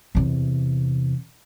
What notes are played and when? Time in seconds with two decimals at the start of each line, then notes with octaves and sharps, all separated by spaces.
0.15 E2 C3